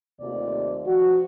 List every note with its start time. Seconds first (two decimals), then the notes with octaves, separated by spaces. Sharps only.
0.21 D#2 C3 A3 F4 D5
0.86 F3 F#4